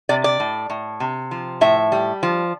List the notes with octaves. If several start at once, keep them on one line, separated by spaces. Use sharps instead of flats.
C3 D5
D5
A2
A2
C3
F3
A2 E5
G3
F3